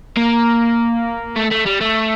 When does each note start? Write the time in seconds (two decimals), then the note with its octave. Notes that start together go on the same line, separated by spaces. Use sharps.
0.17 A#3
1.36 A3
1.51 A3
1.66 G3
1.81 A3